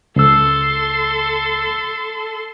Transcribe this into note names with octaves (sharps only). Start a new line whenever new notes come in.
C#2 A4 C6 E6